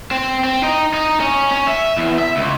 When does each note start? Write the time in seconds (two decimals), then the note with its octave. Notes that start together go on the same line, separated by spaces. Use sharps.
0.11 C4
0.44 C4
0.63 D#4
0.94 D#4
1.20 C#4
1.52 C#4
1.67 E5
1.97 E2
2.19 E5
2.37 C#2